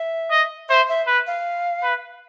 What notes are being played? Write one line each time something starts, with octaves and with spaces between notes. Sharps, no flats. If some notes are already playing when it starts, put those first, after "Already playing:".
Already playing: E5
D#5
C5 E5
E5
B4
F5
B4